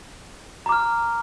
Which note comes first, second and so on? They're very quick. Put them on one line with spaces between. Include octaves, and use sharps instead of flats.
A#5 D6 F6